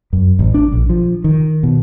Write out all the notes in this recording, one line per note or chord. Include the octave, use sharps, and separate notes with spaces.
F#2
A1
D4
A#1
F3
D#3
B2